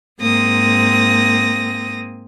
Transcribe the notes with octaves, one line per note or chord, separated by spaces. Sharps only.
G#2 A#3 C4 D#6 A#6